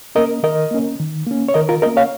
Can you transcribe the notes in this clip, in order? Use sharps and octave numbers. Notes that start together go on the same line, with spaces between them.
A#3 C#4 A#4 D#5
D#3 A#4 D#5
A#3 C#4
D#3
A#3 C#4
C#5
D#3 A#4 D#5
F4 A#4
A#3 C#4 A#4 D#5
C#5 F5